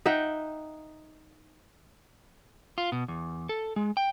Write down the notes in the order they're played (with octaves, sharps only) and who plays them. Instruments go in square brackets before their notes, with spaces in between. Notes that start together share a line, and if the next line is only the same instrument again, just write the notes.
[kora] D#4 E5 F#5 G5
[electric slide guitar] F4
B2
E2
A4
G#3
G5